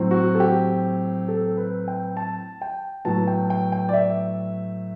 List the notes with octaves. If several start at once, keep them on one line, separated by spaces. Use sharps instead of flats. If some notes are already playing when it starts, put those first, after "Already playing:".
Already playing: A2 F#3 C4
F#4
A4
G4
A4
B4
G5
A5
G5
A2 F#3 B3 A5
G5
G5
G5
D5
E5